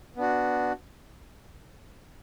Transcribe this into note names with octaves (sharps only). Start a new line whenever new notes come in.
B3 D4 F#4